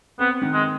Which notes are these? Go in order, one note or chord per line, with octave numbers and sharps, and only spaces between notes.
B3 C4
D#3
G#3